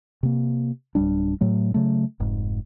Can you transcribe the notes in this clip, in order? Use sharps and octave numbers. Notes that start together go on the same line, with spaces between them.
C3 A#3
D1 G1 G3 D4
A2 F#3 A3
C#3 F#3 A3
F1 G#2